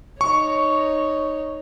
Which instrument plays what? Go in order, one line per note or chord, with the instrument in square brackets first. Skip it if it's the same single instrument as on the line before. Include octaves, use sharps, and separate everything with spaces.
[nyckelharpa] D#4 C#5 [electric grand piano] C#6